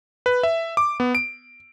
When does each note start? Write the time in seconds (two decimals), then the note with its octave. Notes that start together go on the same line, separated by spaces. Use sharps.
0.26 B4
0.43 E5
0.77 D6
1.00 B3
1.15 D7